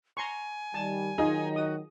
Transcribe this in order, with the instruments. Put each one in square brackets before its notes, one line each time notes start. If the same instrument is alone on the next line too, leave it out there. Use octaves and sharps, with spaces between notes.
[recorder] G#5 [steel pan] A#5 C6 C#6
[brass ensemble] D#3 G3 [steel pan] A5
[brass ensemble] D#3 F#3 [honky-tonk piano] D#4 [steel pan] F4 G#4
[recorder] F#4 [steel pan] D#6